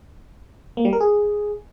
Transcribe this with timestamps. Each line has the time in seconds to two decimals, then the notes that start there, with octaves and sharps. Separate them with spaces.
0.77 A#3
0.85 G3
0.93 A#4
1.00 G#4